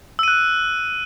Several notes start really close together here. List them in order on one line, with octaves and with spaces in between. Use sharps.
E6 D#7 F#6